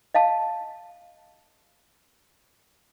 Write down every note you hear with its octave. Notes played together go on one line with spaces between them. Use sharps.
D#5 F5 A5